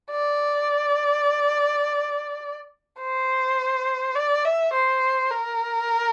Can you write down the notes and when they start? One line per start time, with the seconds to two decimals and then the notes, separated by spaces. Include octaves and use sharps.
0.11 D5
3.00 C5
4.15 D5
4.45 E5
4.73 C5
5.31 A#4